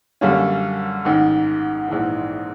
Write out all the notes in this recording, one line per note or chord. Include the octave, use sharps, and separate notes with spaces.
F#2 D3 G3 A#3 C#4
A1 G#2 D#3
A#1 G#2 E3